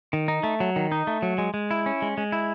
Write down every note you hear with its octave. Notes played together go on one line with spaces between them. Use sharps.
D#3
D#4
A3
F#3
D#3
D#4
A3
F#3
G#3
G#3
E4
C#4
G#3
G#3
E4